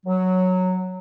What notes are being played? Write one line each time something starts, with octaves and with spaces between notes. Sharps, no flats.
F#3